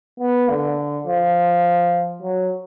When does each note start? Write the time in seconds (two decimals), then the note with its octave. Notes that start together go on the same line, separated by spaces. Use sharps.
0.20 B3
0.49 D3
1.07 F3
2.22 F#3